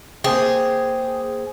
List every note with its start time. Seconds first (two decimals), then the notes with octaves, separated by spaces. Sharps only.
0.24 A#3 G4 G#4 C5 G5